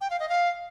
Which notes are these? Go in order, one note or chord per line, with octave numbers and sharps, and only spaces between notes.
G5
F5
D#5
F5